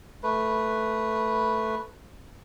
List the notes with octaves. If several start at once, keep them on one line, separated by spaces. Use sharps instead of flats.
A3 B4